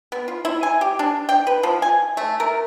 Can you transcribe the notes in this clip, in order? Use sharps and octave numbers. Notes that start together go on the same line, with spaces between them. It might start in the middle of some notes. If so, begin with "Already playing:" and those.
B3
F4
E4
G#5
G4
D4
G5
B4
F3
G#5
A3
A#4